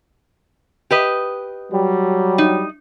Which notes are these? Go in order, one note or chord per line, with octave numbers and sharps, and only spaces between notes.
G4 B4 D#5
F#3 G3
D#4